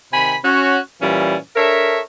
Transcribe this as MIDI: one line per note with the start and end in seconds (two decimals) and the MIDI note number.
0.13 0.36 48
0.13 0.36 51
0.13 0.36 80
0.13 0.36 83
0.45 0.79 61
0.45 0.79 66
1.01 1.37 46
1.01 1.37 52
1.01 1.37 55
1.01 1.37 61
1.56 2.00 62
1.56 2.00 69
1.56 2.00 70
1.56 2.00 73
1.56 2.00 76